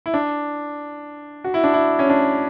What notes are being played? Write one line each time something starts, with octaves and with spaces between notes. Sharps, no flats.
E4
D4
F#4
E4
D4
E4
C#4
D4